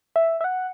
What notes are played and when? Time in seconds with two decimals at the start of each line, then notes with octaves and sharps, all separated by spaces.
0.16 E5
0.41 E5
0.44 F#5